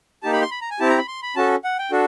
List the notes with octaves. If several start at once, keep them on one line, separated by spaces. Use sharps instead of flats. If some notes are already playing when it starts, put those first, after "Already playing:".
A#3 D#4 G4 A5
B5
C6
B5
A#5
G#5
C4 E4 G4 A5
A#5
B5
C6
B5
C#4 F#4 A4 A5
F#5
G5
D4 F#4 A4